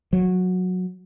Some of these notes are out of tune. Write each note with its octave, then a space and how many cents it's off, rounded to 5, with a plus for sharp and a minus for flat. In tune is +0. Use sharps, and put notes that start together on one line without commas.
F#3 -15